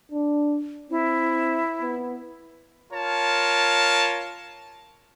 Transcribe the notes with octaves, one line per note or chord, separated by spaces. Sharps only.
D4
C4 E4
B3
F4 A#4 C#5 A5